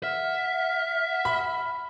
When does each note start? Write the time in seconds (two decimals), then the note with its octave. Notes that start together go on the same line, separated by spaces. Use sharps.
0.03 E5 F#5 F6
1.25 B5